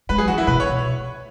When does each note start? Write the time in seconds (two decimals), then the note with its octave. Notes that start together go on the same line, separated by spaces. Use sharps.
0.09 G#3 B4
0.18 F#3 G#4
0.28 E3 F#4
0.38 D#3 E4
0.47 B2 B4
0.60 C#5